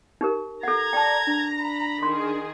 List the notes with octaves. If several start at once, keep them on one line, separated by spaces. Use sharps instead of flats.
D#4 G4 A#4
A4 F#5 A#5 G#6
D5 G5 A5
D4
B5
D#3 G#4 C6